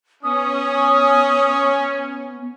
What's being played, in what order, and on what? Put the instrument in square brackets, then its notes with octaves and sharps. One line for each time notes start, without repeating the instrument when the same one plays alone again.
[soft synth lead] B3 [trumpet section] C#4 [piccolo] D#6